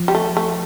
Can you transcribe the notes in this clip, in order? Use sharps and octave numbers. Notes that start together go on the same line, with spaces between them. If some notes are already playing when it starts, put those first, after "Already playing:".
Already playing: F3
G3
A3
A3